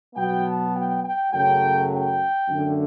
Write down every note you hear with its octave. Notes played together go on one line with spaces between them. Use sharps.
B2 F#3 B3 G5
A5
G5
G5
F#2 C#3 F#3 A3 G5
G5
F#2 D3 A3